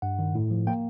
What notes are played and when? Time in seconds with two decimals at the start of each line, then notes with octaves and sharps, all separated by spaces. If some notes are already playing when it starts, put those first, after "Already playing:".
0.02 G2 F#5
0.19 D#3
0.35 A2
0.51 F3
0.67 A#3 G5